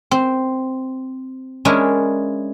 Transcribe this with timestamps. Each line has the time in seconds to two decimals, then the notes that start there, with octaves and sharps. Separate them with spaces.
0.11 C4
1.65 G#3 C#4 D4 E4 A#4